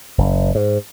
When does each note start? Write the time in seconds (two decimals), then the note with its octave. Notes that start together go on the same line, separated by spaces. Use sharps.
0.18 F#1
0.55 G#2